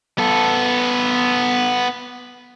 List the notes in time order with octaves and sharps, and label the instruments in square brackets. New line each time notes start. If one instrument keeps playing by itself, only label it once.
[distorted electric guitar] B3 A4